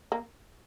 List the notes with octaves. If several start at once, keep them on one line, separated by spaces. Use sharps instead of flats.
A#3